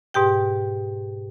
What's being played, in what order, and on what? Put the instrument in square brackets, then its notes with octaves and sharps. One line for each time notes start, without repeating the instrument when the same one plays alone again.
[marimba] G#2 B2 G4 G5